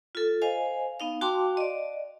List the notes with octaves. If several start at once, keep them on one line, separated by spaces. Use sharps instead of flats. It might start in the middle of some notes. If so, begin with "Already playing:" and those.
F4 A4
C5 D#5 F5 G#5
B3 D#4 F5
F#4 F5 G5 A5 C6 D6
D5 D#5